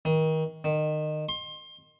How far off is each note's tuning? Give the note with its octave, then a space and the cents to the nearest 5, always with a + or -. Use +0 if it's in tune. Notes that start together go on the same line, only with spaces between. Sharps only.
D#3 +30
D#3 -25
C6 +25